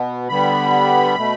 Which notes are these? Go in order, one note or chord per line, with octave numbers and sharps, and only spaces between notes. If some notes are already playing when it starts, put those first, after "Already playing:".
Already playing: B2 B3
D3 G3 B3 B5
B2 A3